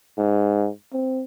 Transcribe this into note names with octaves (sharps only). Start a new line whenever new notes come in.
G#2
C4